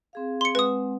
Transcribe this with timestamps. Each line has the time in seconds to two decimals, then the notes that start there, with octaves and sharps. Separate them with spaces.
0.13 C4 G#4 F5
0.41 C6 C#7
0.55 G#3 C4 B4 F#5 D#6